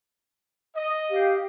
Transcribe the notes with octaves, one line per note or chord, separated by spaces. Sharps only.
D#5
G4 F5